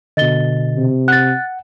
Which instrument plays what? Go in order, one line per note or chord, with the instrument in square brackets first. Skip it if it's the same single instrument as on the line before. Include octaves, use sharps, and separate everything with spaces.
[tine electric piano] B2 D3 [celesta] D#5 A6 G7
[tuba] C3
[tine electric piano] F#5 [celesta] F#6 A6